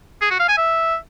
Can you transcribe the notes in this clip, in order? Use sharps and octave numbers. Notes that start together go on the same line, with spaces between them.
G#4
F#4
F5
G#5
E5